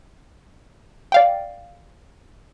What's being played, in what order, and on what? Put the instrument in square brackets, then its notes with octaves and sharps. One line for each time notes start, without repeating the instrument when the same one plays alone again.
[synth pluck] D5 F5 G5